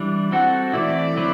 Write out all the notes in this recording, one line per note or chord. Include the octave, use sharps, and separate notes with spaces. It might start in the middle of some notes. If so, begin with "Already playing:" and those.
Already playing: E3 G3 D4
C4 F#4 A4 F#5
E3 A3 C4 E4 D5
D3 F#3 C4 E4 B4